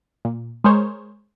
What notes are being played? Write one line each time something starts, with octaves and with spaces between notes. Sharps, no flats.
A#2
G#3 G#4 A#4 C5 C#5